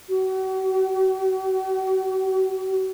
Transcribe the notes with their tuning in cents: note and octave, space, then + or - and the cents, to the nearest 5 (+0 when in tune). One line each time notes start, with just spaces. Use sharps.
F#4 +40